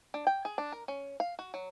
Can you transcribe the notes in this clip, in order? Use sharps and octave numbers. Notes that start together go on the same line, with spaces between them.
D4
G5
G#4
D4
A#4
C#4
F5
F#4
F#3